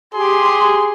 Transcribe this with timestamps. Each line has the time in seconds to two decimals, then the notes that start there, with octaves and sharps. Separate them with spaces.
0.14 G4 G#4 C6